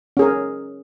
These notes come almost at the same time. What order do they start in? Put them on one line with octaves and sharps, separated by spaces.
C#4 G#4 A#4